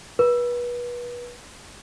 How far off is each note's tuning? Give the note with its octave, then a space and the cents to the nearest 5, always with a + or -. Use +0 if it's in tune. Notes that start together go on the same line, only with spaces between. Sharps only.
B4 -30